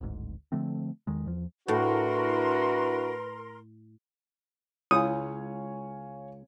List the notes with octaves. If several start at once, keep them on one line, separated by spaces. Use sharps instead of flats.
D1 G#1 D2 G#2
D3 F3 A3 C4
E2 D#3 G#3
E2 F3
A2 D4 E4 F#4 A#4 B4 C6
C#2 E4 C#5 F5 G#5 D#6